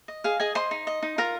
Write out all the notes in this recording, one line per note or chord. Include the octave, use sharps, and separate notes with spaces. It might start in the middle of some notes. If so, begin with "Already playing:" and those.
D#5
G#4 F5
G#4 D#5 G#5
C5 D#5 C6
D#4
D#5
D#4
F4 A#4 A#5